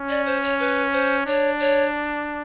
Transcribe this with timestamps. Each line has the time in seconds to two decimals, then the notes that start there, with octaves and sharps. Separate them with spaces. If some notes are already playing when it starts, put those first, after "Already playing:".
Already playing: C#4
0.10 D5
0.26 C5
0.43 C#5
0.60 B4
0.93 C5
1.27 D4 C#5
1.60 C#5